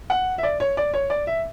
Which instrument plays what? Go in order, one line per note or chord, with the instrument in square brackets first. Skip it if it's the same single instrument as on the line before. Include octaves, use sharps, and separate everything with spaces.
[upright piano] F#5
E5
D5
C#5
D5
C#5
D5
E5